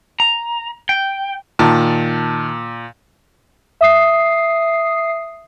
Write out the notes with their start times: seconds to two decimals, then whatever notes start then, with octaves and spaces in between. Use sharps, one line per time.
0.20 A#5
0.89 G5
1.59 A#2 D#3 A5
3.81 E5 D#6 C7